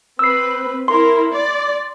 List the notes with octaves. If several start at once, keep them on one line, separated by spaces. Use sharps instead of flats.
C4 B4 E6 C7
E4 A#4 C6
D5